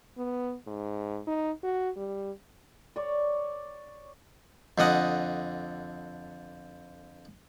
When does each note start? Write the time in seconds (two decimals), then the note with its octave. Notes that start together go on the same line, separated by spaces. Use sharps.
0.18 B3
0.67 G#2
1.27 D#4
1.63 F#4
1.97 G3
2.96 C#5 D5
4.78 F2 D3 D#5 F#5